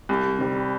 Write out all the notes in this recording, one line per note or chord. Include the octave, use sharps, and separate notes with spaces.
C2
C3 G3